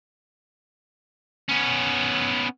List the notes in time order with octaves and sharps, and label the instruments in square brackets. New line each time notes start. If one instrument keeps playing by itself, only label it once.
[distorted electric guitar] B3 C#4